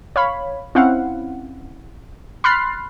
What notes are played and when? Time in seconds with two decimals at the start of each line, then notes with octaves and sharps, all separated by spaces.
0.16 C#5 F5 B5
0.75 C4 C#4 E4 F5 F#5
2.44 B5 C6 F6 F#6 A6 C7